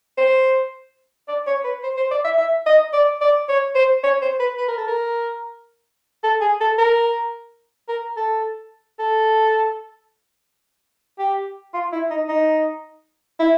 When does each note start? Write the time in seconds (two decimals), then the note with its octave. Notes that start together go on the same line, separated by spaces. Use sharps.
0.18 C5
1.28 D5
1.47 C#5
1.64 B4
1.83 C5
1.97 C5
2.11 D5
2.24 E5
2.38 E5
2.66 D#5
2.93 D5
3.21 D5
3.49 C#5
3.75 C5
4.03 C#5
4.22 C5
4.40 B4
4.58 B4
4.68 A#4
4.77 A4
4.87 A#4
6.23 A4
6.41 G#4
6.60 A4
6.78 A#4
7.89 A#4
8.17 A4
8.99 A4
11.19 G4
11.74 F4
11.92 E4
12.10 D#4
12.28 D#4
13.40 E4